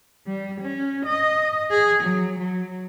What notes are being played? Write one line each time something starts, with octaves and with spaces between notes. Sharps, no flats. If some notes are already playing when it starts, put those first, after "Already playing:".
G3
C#4
D#5
G#4
F#3
F#3